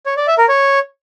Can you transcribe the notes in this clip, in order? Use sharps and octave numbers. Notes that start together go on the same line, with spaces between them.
C#5
D5
E5
A#4
C#5